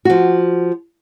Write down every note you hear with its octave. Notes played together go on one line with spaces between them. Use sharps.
F3 F#4